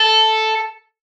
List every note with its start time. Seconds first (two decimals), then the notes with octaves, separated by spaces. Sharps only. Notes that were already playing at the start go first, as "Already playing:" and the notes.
Already playing: A4